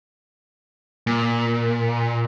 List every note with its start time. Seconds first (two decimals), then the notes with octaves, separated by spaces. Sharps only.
1.07 A#2